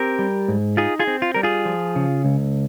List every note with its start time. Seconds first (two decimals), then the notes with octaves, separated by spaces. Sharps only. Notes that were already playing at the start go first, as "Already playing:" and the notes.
Already playing: C4 G4 A#4
0.19 G3
0.48 G#2
0.77 D#4 F4 G#4
0.99 F4 G#4
1.07 C4
1.22 F4
1.34 G3 A#4
1.43 F4 G#4
1.65 F3
1.96 C#3
2.25 C#2